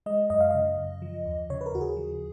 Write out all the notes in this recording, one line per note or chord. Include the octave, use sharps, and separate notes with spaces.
G#3 D#5
F#2 D#5
F5
C#3 D#5
F#2
F3
D#2
C#3 C#5
B4
A#4
D#2 F#4
G#4
F3